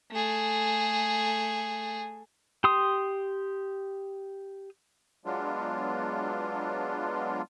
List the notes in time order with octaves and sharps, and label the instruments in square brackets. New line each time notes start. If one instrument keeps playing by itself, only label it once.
[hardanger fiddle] A3 G#4
[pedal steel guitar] G4 C6 D#6
[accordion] F#3 G#3 B3 D4 F4